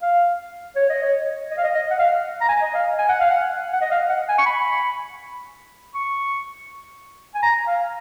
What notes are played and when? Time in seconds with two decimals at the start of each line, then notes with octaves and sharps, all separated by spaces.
0.02 F5
0.76 C#5
0.90 D#5
1.03 C#5
1.51 D#5
1.58 F5
1.64 D#5
1.75 D#5
1.90 F#5
1.99 F5
2.41 A#5
2.49 G#5
2.62 D#5
2.74 F5
2.99 G#5
3.09 F#5
3.21 F5
3.31 F#5
3.73 F#5
3.81 D#5
3.91 F5
4.09 F#5
4.29 G#5
4.38 C#6
4.46 B5
5.95 C#6
7.35 G#5
7.43 A#5
7.67 F5